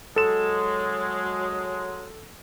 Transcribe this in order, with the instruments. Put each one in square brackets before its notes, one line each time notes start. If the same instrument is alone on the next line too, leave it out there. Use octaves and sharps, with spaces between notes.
[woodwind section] F#3 G#3 [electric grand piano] A4 E7